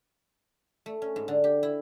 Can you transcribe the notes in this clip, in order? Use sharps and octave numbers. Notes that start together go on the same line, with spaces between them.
A3
C#4
G#2
D3
G4
E4